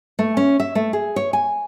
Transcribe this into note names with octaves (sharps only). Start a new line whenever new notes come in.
A3
C#4
E5
A3
G#4
C#5
G#5